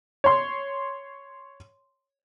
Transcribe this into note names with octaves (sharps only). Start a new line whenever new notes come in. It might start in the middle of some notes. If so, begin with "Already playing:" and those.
C#5 C6